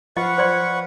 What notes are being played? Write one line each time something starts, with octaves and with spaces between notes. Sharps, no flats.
F3 F4 B4 D#5 F5 F#5 C#6
C5 D5 C6